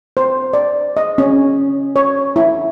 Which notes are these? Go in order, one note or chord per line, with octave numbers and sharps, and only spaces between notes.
C5
D5
D#5
C#4
C#5
E4